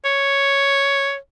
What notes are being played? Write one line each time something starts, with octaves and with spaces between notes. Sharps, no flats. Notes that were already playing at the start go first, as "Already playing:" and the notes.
C#5